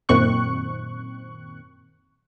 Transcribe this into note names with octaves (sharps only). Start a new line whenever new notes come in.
F#2 A#2 D#3 C4 C#6 F#6